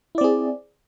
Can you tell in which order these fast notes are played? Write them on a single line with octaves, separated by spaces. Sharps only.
E4 D5 C4 G#4